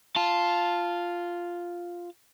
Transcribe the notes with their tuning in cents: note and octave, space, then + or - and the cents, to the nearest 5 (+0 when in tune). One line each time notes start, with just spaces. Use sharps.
F4 +0 A5 +0